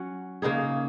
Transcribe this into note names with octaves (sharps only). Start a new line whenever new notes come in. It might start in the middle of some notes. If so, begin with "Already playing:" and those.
Already playing: F#3 C#4 F#4
C#3 A#3 D#4 G#4